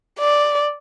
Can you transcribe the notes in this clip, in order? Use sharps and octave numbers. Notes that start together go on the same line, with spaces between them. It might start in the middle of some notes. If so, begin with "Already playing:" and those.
D5